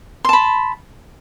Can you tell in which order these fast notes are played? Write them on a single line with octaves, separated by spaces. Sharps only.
C6 A5 B5